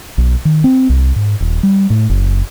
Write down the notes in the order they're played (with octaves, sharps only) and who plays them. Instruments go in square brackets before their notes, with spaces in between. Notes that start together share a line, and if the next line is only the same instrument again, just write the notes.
[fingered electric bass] B1
D#3
C4
C2
G#2
D#1
G3
A2
F#1